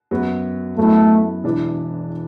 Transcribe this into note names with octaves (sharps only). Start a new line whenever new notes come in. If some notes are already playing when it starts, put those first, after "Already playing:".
F#2 F#3 B3 F#4
F#2 F#3 A3 B3 E4
E1 E2 E3 D4